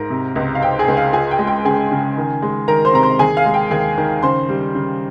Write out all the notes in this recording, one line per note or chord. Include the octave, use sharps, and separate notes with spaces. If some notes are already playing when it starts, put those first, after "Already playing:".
Already playing: G#2 A#4 A#5
C3
C#2
F5
C4 G5
G#4 G#5
C#2
F5
F4 G#4 G#5
G5
G#3
G5
C#3 G#4 G#5
C#3
D#3
G#3
D#3 A#4 A#5
C5 C6
C3 A#5
C5 C6
D#2 G#4 G#5
F5
G#3
G5
D#2 G#4 G#5
D#3
C#3 C5 C6
G3
C#3